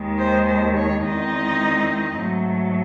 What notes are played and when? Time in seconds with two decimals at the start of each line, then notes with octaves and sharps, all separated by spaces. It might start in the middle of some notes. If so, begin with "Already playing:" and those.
Already playing: D#2 D#3 G#3
0.18 C5
0.47 C5
0.76 C#5
1.03 E2 D#3 G#3 C4 D#4 D#5
2.18 G#2 F#3 A3